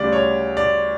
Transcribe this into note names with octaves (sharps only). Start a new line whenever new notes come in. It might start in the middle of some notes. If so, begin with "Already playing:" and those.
Already playing: D2 C#3 G3 D5
C#5
D5